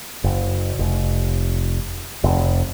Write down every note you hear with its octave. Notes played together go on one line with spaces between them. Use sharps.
F#1
F1
F1